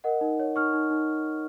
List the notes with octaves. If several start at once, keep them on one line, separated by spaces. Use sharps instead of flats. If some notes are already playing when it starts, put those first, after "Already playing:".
A#4 D#5 F#5
D#4
C#5
D#4 C#6 F6
D#4
D#4